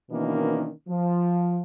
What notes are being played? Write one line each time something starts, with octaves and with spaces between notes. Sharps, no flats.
B2 D#3 E3 A#3 C#4 D4
F3